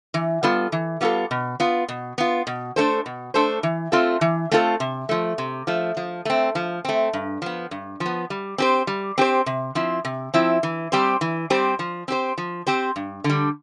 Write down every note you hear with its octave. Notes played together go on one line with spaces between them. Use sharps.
E3
G3 B3 F4 A4
E3
G3 B3 F4 A4
B2
B3 F4
B2
B3 F4
B2
A3 D4 A4 C5
B2
A3 D4 A4 C5
E3
A3 C4 F4 A4
E3
A3 C4 F4 A4
C3
F3 A3
C3
F3 A3
F3
A3 C4
F3
A3 C4
G2
F3 B3
G2
F3
B3
G3
C4 G4 C5
G3
C4 G4 C5
C3
F3 C4 E4
C3
F3 C4 E4
E3
G3 C4 G4 C5
E3
G3 C4 G4 C5
F3
C4 G4 C5
F3
C4 G4 C5
G2
D3
G3